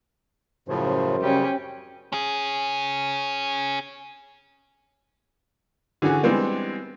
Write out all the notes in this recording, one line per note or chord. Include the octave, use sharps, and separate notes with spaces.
F#2 A2 C#3 F3 C5
C#3 G3 C#4 G4
C#4 G#4
D3 E3 C#4 F#4 G#4
E3 G3 G#3 B3 C4 D4